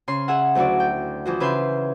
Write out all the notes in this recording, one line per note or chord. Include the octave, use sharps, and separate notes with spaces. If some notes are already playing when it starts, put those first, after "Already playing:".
C#3 C6
G#4 E5 F#5
D2 F#3 E4 F#4 D5
G5
E3 F3 F#4
C#3 B4 E5 C6 G6